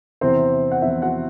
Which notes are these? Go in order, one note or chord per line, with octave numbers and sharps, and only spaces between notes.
E2 C3 E3 C4 C5
F#5
E2 C3 E3 E4 E5
F#4 F#5